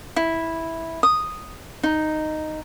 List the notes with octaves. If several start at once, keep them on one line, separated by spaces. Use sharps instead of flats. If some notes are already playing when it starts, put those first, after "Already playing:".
E4
D#6
D#4